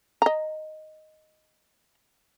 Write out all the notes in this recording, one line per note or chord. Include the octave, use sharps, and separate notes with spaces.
D#5 A#5